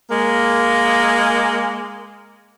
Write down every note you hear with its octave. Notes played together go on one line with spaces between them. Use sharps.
G#3 A#3